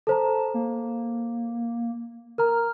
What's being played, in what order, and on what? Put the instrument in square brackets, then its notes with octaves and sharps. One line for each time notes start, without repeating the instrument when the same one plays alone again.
[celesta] A4 C5 A#5 [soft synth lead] A5
[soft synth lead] A#3
[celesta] A#4 A#5 [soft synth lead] F6